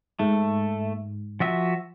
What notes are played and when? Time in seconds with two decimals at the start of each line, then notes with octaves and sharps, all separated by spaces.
0.19 G#2 A3
1.40 F3 F#4 E5